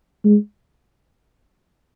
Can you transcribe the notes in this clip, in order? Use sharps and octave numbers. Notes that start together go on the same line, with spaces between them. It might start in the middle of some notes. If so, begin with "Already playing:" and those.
G#3